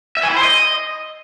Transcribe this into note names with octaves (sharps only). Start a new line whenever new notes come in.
E5
G#5
E4
C5
D#5